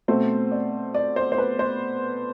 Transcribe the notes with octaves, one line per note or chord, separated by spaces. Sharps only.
B2 A3 C4 C5
D5
D5
C5
C5
B4
C5